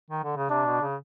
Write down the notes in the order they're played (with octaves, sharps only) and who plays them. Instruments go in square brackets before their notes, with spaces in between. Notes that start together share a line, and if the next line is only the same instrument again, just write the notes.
[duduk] D#3
D3
C#3
[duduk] C3 [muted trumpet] D4
[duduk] B2
C#3